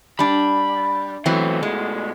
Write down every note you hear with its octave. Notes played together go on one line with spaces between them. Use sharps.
G3 D4 B5
B2 E3 F#3 A3 C4
G#3